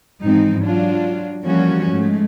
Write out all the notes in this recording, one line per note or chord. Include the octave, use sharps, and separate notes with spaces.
G#2 E3 F3 C4 D#4
F#3 D4 F4
E3 F3 G3 A#3 C#4 F#4
G#2 G#3 A3